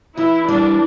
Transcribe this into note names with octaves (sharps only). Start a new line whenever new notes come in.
E3 E4
G3 D4